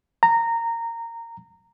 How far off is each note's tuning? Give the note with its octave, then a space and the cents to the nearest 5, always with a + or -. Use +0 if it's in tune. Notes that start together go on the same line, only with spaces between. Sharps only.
A#5 -15